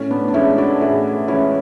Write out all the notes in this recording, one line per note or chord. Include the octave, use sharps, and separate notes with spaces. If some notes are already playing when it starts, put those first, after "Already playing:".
Already playing: A2 C#4
B3 D4
D4
E3 G#3 C#4 E4
D4 F#4
A2 E4 G#4
E3 G#3 C#4 E4